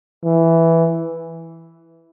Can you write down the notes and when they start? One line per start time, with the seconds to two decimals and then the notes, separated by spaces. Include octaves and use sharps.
0.24 E3